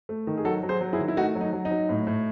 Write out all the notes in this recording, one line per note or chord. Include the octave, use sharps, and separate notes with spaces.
A3
D#3
G#4
F#3 F#4 A4
F#3
G#4 C5
F#3
E4 G#4
D#3
E4
A3 D#4 F#4
F#3
D#4
F#3
D#4
F#3
A2
A2